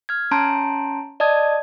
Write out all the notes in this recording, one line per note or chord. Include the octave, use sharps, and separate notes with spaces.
F6 G#6
C#4 A5 A#5 C6 G6 D7
D5 D#5 A5 D#6 G#6